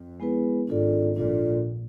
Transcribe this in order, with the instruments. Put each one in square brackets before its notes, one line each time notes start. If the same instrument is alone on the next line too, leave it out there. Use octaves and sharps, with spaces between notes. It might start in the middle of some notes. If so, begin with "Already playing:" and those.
Already playing: [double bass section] F2
[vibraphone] G#3 B3 E4 G#4 B4
[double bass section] G#1 G#2 [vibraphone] D4 F4 A4 D5
[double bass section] A#1 A#2 [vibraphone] D4 F4 A4 D5